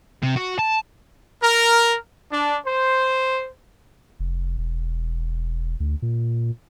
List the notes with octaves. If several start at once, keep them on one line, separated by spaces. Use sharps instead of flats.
C3
F#4
A5
A#4
D4
C5
F1
E1
D2
A#2